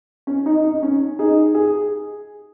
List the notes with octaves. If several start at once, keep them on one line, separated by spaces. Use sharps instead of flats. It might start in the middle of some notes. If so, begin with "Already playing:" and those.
C#4
D#4
D#4
C#4
D#4 G#4
G#4